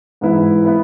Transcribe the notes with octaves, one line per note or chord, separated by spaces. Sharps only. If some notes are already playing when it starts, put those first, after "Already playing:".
G#2 E3 B3 E4 B4
B3 E4 B4